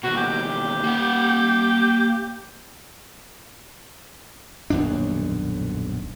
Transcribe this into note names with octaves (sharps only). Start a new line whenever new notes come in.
D#2 B2 F#4
G4
A#3 F#5
D#1 B1 F#2 D4